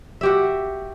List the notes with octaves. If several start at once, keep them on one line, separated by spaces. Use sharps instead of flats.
F#4 G4 E5